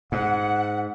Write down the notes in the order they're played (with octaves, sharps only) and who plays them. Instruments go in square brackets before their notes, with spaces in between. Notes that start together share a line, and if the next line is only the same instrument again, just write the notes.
[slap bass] G#2 [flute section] F#5